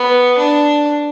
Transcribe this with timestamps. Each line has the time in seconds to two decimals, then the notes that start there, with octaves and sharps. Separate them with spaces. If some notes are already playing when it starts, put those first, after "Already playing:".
Already playing: B3
0.38 D4